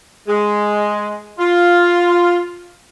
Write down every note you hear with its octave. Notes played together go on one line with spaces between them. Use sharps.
G#3
F4